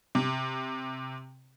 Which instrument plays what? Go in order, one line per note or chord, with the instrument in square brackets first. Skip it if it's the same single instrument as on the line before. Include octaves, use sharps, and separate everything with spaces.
[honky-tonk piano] C3